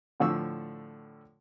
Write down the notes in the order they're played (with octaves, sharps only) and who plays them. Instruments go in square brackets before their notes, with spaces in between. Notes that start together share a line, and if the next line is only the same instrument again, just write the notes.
[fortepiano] A2 D3 F3 C#6 E6